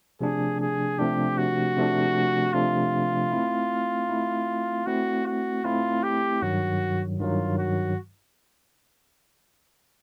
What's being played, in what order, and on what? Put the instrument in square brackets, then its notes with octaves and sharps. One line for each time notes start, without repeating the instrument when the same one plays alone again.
[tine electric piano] C3 F3 A3 D4 [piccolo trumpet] G#4
[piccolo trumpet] G#4
[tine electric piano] C3 F3 A3 D4 [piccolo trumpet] G4
[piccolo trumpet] F#4
[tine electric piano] C3 F3 A3 D4
[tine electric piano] C3 F3 A3 D4 [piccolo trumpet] F4
[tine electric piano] A3 C4 E4
A3 C4 E4
[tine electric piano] A3 C4 E4 [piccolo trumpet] F#4
[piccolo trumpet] F#4
[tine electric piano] A3 C4 E4 [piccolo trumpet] F4
[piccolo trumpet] G4
[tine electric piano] G2 D#3 F#3 [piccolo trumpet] F#4
[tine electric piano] G2 D#3 F#3 [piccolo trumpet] F4
[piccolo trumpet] F#4